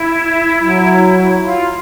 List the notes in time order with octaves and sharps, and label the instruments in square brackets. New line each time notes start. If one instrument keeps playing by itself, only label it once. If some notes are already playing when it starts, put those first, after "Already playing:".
Already playing: [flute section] E4
[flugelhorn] F#3
[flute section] F4